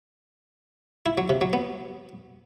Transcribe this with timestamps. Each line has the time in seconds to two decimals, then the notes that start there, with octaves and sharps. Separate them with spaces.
1.06 E4
1.18 F#3
1.29 C3
1.41 F#3
1.53 B3